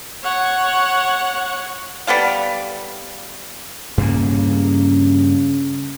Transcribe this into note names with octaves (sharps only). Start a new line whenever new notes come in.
C#5 F#5
G3 B3 A4 F5
G2 C#3 A#3